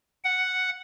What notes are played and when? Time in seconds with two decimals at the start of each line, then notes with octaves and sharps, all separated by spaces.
0.24 F#5